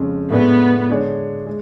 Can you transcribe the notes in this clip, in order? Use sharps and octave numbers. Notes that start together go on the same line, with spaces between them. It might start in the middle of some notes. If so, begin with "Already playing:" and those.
Already playing: F2 C#3 G#3 C#4
A2 G#3 B3 D4 G#4 B4
D3 G#3 D4 G#4 C#5
G#3